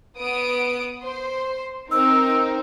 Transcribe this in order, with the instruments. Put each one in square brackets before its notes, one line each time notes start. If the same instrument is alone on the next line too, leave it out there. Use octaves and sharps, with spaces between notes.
[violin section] B3 D#6 D7
C5 C6
[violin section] C4 D#4 A#4 [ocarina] E6